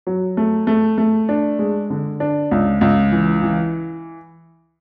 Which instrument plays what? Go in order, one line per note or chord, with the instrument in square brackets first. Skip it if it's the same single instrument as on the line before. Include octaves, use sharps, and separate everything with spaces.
[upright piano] F#3
A3
A3
A3
D4
G#3
D3
D4
C#2
C#2
E3
E3